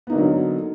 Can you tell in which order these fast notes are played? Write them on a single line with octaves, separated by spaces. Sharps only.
B3 D#4 A#3 D3 F#3